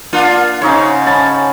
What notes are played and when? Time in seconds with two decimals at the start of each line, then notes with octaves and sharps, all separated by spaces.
0.13 A#3 D4 F4
0.62 G#2 C#3 D#4 C#5
1.06 C#4 A5 B5